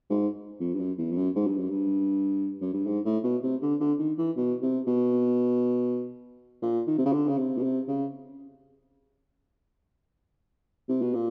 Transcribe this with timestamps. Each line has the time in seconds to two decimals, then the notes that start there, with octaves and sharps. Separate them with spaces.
0.10 G#2
0.60 F2
0.73 G2
0.79 F#2
0.98 E2
1.12 F2
1.16 F#2
1.35 G#2
1.47 G2
1.58 F#2
1.69 G2
2.61 F#2
2.73 G2
2.86 G#2
3.05 A2
3.24 B2
3.43 C3
3.62 D3
3.80 D3
3.99 D#3
4.18 E3
4.37 B2
4.62 C3
4.87 B2
6.62 A#2
6.87 D#3
6.98 C3
7.05 C#3
7.13 D3
7.28 C#3
7.38 C3
7.58 B2
7.63 C3
7.88 C#3
10.89 C3
11.01 B2
11.14 A#2